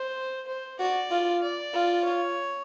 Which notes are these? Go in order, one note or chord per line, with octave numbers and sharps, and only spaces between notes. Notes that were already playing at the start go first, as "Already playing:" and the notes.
Already playing: C5
C5
F#4 D5
F4
D5
F4
C#5